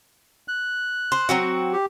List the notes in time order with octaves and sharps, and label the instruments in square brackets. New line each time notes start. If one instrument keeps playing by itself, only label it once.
[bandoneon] F#6
[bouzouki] C5
F#3 C4 F#4
[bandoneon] G4